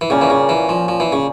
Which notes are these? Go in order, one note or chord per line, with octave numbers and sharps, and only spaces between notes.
E3
A#2 C#3 G3 A#3 C#4
E3
C#3
E3
F3
F3
E3
C#3